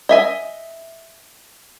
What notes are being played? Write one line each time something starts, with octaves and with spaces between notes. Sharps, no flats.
D#5 E5 G#5